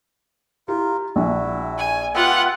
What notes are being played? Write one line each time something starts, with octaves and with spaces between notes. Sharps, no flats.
E4 F4 G4 A#4
A#1 E4 F#4
G#5
B3 F4 G4 E5 F#5